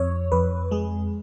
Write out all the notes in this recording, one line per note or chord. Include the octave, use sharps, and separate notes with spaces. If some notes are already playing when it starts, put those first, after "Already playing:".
Already playing: F2 C#5
F2 B4
G#3 G#4